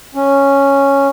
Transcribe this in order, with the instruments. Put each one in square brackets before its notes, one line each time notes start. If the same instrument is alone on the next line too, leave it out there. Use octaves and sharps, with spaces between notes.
[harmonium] C#4